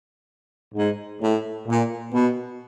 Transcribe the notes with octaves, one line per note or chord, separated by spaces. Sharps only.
G#2
A2
A#2
B2